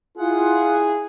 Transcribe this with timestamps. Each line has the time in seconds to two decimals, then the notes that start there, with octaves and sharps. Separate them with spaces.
0.18 E4 F4 G#4 F#5